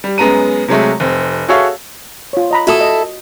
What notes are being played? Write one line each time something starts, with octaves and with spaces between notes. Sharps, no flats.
G3
F#2 G#3 B3 A#5 D#7
C3 F#3 G#3 A3
F1 C4
F#4 G#4 A4 C#5 E5 F5
F4 C#5
D#5 A#5 B5
E4 F#4 A4 D#6
D#5